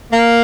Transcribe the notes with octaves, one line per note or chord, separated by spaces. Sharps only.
A#3